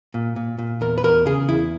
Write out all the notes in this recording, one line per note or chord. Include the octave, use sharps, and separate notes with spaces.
A#2
A#2
A#2
E2 A#4
B4
E2 A#4
C#3 G#4
E2 E4